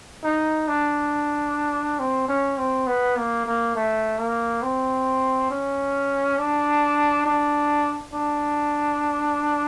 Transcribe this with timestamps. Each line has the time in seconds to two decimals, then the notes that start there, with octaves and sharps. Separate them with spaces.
0.24 D#4
0.68 D4
1.99 C4
2.28 C#4
2.58 C4
2.87 B3
3.17 A#3
3.46 A#3
3.75 A3
4.19 A#3
4.62 C4
5.50 C#4
6.38 D4
7.26 D4
8.13 D4